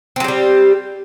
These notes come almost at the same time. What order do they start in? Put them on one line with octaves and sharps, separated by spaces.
C4 F#3 G4 G3